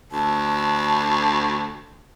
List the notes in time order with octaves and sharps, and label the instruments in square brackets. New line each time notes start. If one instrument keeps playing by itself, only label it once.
[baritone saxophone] D2 [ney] A5